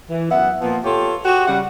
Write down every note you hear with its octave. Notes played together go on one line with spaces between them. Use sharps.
E3
F#2 B3 E5 F#5
A#2 F3 B3
F4 G4 A4 C#5
F#4 G4
C#3 G3 F#5